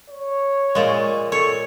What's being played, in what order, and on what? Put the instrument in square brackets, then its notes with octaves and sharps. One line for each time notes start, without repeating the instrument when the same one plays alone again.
[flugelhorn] C#5
[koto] A#2 G#3
[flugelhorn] A4 [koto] C#5